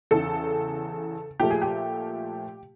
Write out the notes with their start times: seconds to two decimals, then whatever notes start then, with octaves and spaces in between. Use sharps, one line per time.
0.11 E2 C#3 E3 A4
1.40 A#2 F3 A3 G4
1.51 G#4
1.62 G4